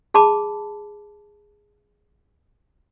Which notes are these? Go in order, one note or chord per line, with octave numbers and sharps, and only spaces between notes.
G#4 A5 B5 D6